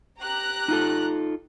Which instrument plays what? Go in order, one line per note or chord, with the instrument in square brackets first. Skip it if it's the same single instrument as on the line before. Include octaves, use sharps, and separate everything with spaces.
[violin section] G4 A#5 F#6
[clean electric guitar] D#4 F4 A4